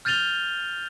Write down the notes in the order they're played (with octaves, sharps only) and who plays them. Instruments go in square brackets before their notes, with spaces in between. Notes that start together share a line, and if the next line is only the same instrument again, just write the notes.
[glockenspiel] F6 G6 A6 D#7 F7 G7